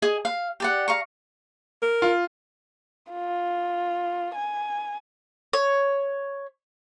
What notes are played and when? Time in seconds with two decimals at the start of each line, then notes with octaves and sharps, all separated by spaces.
0.02 G#4 D#5 G#5 D#6
0.25 F5
0.60 G4 D5 F#5
0.88 F5 A#5 C#6
1.82 A#4
2.02 F4
3.12 F4
4.35 G#5
5.53 C#5